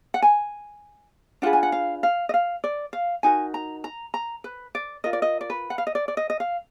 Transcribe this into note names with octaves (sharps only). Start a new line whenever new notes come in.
F#5
G#5
D4 F4 G#4 B4 F#5
G#5
F#5
F5
F5
D#5
F5
D5
F5
D#4 F#4 A#4 G#5
A#5
A#5
A#5
B4
D5
F4 A#4 D#5
D5
D#5
D5
B4
F#5
F5
D#5
D5
D5
D#5
D#5
F5